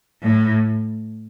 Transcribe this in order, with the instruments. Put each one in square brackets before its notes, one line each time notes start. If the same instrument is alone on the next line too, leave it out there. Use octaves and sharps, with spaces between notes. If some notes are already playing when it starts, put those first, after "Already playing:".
[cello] A2